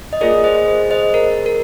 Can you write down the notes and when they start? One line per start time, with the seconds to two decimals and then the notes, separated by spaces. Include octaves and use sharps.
0.13 D#5
0.21 A#3 F4 G#4 A#4 D5
0.44 C5 D#5
0.68 C5
0.91 C5 D#5
1.14 A#4
1.46 A#4